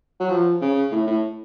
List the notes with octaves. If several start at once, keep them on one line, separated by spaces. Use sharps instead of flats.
F#3
F3
C#3
A2
A2